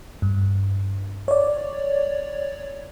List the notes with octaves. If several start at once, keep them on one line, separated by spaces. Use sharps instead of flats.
G2
C#5 D5